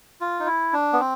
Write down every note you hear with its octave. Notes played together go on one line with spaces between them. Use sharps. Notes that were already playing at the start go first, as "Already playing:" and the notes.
F4
D#4
E4
D4
B3
C4